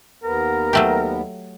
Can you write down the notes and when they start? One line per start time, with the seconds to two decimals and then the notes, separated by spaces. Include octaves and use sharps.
0.24 D#2 B3 A#4
0.73 F#3 A3 G4